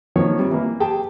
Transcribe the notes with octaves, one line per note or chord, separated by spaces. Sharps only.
D#3 F3 A#3 C#5
C3 G3
E3 A#3 E4
G4 G#4 G5 A5